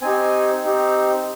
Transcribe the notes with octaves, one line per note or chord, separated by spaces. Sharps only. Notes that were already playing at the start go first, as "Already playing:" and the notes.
C4 D#4 G4 G#5
C4 D#4 G4